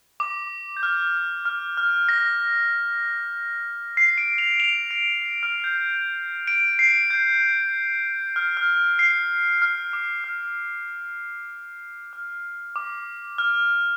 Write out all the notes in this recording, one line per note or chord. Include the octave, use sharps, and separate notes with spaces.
D6
G6
F6
F6
F6
A#6
C7
D7
F7
F7
D7
C7
F6
G6
D7
C7
G6
F6
F6
C7
F6
D6
F6
F6
D6
F6